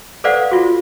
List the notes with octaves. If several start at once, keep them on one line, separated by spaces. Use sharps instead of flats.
A4 B4 C5 D5 F5 F#5
F4 F#4